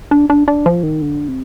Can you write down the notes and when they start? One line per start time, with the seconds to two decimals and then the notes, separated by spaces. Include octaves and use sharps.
0.11 D4
0.30 D4
0.48 D4
0.66 F3
0.83 D#3
1.02 D3
1.28 C3